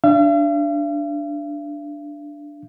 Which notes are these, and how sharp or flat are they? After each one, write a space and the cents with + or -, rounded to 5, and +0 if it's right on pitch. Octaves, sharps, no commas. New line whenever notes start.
D4 +0 F5 -45